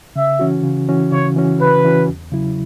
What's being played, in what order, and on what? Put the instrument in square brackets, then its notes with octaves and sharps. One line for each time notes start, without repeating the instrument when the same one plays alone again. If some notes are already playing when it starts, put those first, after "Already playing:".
[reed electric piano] C#3 [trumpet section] E5
[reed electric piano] E3 C#4 F#4
C#3
E3 C#4 F#4
[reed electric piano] C#3 [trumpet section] C#5
[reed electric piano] E3 C#4 F#4
[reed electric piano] C#3 [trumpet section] B4
[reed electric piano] E3 C#4 F#4
E2
C#3 F#3 E4